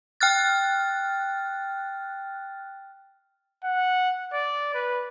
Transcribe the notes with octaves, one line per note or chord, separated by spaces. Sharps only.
G5 F6 F#6 A6
F#5
D5
B4